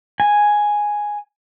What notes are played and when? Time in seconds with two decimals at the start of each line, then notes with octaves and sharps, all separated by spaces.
0.20 G#5